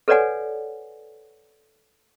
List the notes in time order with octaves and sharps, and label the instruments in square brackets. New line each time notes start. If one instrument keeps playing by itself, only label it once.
[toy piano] A4 B4 C#5 D5 F#5 G#5